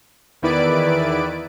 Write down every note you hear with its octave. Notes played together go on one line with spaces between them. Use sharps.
E2 D#3 E4 B4 D5 D7